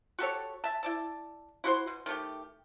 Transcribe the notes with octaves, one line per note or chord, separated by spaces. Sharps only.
F#4 G4 A4 C#5
E5 A5
E4 D5 A5
E4 F#4 C5 C6
B2
D#3 A3 G4